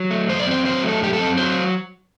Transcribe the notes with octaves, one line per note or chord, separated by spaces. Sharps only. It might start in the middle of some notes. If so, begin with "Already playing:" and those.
Already playing: F#3
A3
F#2 C5
D5
C4 C5
F#3 C5
A3
A4
F#2 G4
A4
C4
F#3 C5